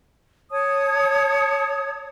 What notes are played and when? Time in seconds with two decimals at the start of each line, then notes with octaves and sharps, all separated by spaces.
0.50 C#5 A5 D#6